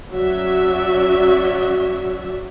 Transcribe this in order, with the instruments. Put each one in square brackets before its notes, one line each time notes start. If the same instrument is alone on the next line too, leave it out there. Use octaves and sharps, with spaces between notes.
[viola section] F#3 C#4 F#4 D5 E5